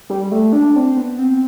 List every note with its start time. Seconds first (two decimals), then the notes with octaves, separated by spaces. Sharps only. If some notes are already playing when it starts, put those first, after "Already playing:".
0.10 G3
0.32 A3
0.53 D4
0.76 C4
0.97 B3
1.19 C4